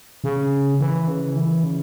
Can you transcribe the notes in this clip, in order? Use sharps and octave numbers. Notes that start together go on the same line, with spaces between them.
C#3
E3
C#3
E3
C#3